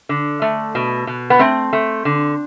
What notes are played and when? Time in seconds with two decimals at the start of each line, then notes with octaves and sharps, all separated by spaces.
0.09 D3
0.42 A3
0.75 B2
1.07 B2
1.30 B3
1.39 A3 C4
1.73 A3
2.05 D3